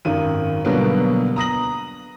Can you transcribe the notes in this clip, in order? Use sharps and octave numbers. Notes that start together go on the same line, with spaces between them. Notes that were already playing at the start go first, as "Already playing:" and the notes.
G#1 F#2 D#3 D#7
B2 D3 F#3 G3 A#3 B3
A#5 D#6 A#6 F#7